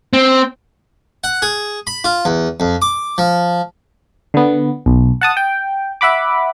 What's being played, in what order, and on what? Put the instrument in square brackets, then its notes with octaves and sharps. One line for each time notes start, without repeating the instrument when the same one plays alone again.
[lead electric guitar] C4
[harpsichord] F#5
G#4
B5
F4
E2
F2
D6
F3
[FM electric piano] D3 B3
B1
F#5 A5 D#6
G5
E5 F#5 B5 D6